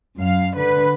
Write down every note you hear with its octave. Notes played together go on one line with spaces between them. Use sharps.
F#2 F5
D3 B4